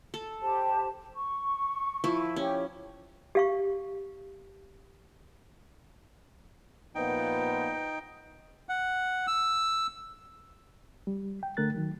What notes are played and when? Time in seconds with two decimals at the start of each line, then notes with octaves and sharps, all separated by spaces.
0.14 A4
0.42 G4 C5 A5
1.15 C#6
2.04 F3 E4
2.36 C#4 G4 C#5
3.35 G4 F5 C#6
6.95 A#2 F3 B3 D#4 G5
8.69 F#5
9.27 E6
11.07 G3
11.43 G5
11.57 D3 A3 A#4 F#6 A6
11.74 D#3 F#3